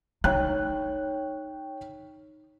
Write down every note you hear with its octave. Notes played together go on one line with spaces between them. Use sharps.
D#4 C#5 G5 F#6